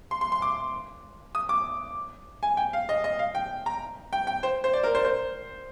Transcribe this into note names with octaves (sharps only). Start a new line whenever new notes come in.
C6
C6
C6
D6
D#6
D6
G#5
G5
F5
D#5
D#5
F5
G5
A#5
G5
G5
C5
C5
D5
A#4
C5
C5